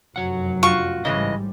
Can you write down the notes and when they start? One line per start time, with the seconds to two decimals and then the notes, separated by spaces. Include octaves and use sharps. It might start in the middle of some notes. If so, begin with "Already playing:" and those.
0.16 F1 F#2 F#3 F#5
0.63 F4 F#4 C#6
1.05 A1 G#2 C#3 E3 G3 G#3 D#5